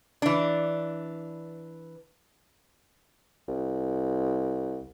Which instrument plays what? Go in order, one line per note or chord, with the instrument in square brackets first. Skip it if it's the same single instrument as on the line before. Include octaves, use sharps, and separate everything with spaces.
[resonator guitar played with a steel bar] E3 D4
[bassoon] C2